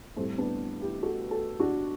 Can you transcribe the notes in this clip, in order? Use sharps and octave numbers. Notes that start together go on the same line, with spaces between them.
A2 G3 A3 C4
B3 D4
E4 G4
F#4 A4
F#4 A4
D4 F#4